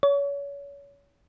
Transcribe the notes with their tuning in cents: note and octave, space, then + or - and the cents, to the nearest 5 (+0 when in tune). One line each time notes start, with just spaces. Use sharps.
C#5 +30